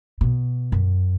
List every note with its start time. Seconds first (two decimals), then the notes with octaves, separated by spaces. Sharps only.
0.21 B2
0.72 F#2